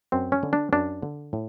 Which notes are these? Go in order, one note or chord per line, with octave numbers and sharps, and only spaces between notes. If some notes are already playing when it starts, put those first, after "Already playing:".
F#2 C4
C#4
D3
D4
F#2 D4
D3
A2